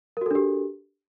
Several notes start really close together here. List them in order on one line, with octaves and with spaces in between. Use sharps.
A#4 F#4 A4 D4 G4